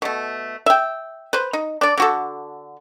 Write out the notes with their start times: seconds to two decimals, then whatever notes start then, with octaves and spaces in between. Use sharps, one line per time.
0.02 B2 A3
0.66 E5 G5
1.33 B4 C5
1.53 D#4
1.81 D4 D5
1.97 D3 F#4 A4